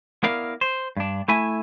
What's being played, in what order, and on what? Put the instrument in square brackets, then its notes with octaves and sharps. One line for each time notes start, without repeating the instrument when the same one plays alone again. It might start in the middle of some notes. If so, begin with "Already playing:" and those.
[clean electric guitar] B3 E4 A#4 D5 F5
C5
G2 D4
A3 E4 E5 G#5